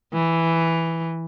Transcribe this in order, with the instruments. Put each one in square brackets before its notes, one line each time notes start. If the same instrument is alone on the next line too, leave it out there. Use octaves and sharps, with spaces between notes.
[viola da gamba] E3